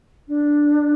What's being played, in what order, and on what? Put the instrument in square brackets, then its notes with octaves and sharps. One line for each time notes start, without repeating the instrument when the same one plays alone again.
[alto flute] D4